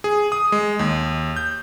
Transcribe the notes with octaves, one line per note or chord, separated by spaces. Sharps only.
G#4
D#6
G#3
D#2
G6